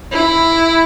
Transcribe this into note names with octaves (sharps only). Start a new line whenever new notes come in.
E4